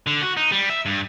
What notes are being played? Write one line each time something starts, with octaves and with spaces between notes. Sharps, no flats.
D3
F#4
D#4
G3
E5
G2